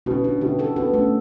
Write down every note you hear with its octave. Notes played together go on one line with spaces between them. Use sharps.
B2 C#4 E4
D4 F#4
B2 E4 G4
F#4 A4
B3 F#4 A4
A3 C#4